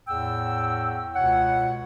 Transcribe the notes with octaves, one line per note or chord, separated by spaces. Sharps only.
E2 A2 F#5 G5 E6
C#2 B2 C#5 F#5